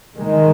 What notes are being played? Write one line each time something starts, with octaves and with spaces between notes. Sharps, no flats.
D#3 G#3